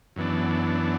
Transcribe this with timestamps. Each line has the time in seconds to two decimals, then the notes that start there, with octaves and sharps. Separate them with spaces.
0.16 F#2 E3 B3 D4